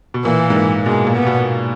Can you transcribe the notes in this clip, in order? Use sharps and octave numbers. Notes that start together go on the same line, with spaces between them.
B2
A#2 E3
G#2
A#2
B2 G#3
A#2
B3
B2